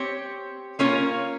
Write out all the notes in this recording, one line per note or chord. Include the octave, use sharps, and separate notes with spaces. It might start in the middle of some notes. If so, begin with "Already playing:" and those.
Already playing: C4 G4 C#5
A#3 C#4 F4 A#4 C#5